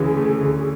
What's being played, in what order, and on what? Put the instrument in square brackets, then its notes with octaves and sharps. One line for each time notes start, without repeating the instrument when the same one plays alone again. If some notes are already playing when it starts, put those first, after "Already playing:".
Already playing: [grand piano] D2 C#3 E3 [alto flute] G#4
[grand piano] A3
D2
[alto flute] G#4